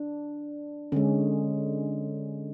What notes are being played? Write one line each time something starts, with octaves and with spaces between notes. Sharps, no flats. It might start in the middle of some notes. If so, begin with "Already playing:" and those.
Already playing: D4
D3 G#3 C#4